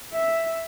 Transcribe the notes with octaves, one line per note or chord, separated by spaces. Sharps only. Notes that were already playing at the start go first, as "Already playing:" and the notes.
E5